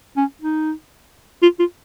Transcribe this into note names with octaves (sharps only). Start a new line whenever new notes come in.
C#4
D#4
F4
F4